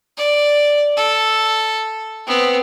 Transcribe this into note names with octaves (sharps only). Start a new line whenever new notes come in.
D5
A4
B3 C4